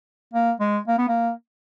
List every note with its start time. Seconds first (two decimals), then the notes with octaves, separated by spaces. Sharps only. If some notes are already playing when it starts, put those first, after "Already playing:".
0.33 A#3
0.60 G#3
0.88 A#3
0.98 B3
1.08 A#3